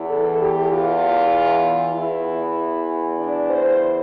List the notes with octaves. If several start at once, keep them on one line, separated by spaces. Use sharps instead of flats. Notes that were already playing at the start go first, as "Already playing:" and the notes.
Already playing: E2 E3
A4
G4
F4
E2 E3 E4
D4
C5